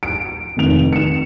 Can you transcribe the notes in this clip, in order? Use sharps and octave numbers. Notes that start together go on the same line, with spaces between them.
D7
F1 D#3 F7
C#7 E7